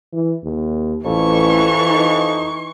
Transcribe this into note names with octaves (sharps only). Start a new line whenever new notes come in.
E3
D#2
A1 F2 E3 C#6
D#4